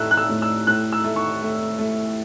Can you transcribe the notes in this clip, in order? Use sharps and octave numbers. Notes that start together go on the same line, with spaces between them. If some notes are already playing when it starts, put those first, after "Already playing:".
Already playing: A2 A3 E6 F#6
F#6
E6
A2
E6
A2 F#6
E6
A3
C#6
A3
A3